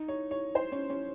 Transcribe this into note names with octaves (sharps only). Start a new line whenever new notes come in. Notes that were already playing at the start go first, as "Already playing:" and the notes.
Already playing: D#4
C#5
C#5
C5
C#4
C#4